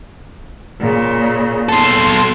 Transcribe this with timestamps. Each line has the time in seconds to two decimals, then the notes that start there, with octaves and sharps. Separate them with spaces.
0.81 A#2 C#3
1.69 B2 A4 C6